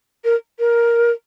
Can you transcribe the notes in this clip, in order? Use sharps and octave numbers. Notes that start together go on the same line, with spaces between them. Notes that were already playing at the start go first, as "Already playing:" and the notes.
A#4
A#4